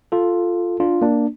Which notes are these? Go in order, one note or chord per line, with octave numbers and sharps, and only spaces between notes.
F4 A4
D4 F4
A#3 D4